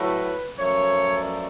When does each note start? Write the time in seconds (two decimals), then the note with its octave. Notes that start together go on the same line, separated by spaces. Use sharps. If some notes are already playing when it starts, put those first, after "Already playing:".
Already playing: A2 F#3 A3 B4
0.56 F#2 F3 A3 C#5
1.18 D5